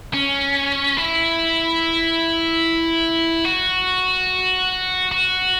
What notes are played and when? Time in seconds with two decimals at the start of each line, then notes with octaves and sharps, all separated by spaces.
0.14 C#4
0.97 E4
3.45 F#4
5.12 F#4